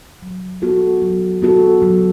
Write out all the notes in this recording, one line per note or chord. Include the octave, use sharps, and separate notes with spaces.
F#3
B3 F#4 A4
F#3
B3 F#4 A4
F#3